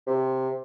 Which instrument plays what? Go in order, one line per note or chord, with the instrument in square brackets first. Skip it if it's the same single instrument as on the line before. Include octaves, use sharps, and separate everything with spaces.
[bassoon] C3